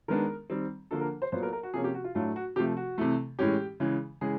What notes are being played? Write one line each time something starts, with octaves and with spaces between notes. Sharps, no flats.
D#3 G#3 B3 D4 A#4
D#3 G3 C4
D3 F3 A#3 D4 A4
A#4
C5
A#2 F#3 B3 C5
A#4
A#4
F#4
C3 F3 A#3 C#4 G#4
G4
F#4
F4
A2 F#3 A3 D4 F4
F#4
C3 F3 A3 G4
F#4
C3 E3 A3
A2 E3 G#3 C#4 G4
C#3 E3 G#3
C#3 E3 G#3 G#4